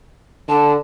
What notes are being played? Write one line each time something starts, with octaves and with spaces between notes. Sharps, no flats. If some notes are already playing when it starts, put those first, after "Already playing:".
D3 A5